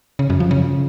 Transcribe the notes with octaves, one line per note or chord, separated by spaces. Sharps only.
C#3
F#2
F3
C#3